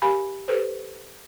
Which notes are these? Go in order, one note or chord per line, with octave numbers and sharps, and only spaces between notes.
G4 A#4 F5 G#5 B5
G4 A4 B4 C5